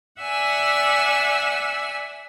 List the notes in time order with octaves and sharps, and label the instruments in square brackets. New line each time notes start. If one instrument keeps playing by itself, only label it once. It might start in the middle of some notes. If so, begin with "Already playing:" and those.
[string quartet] D5 E5 F#5 G#5 E6